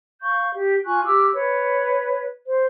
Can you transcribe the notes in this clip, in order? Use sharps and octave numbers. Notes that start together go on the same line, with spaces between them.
F5 C#6 G6
G4
F4 G#5 C#6 F#6
G4 D6 E6 F6
B4 C#5
C5